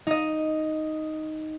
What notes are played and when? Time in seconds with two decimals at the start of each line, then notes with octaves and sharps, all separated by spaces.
0.07 D#4 D#5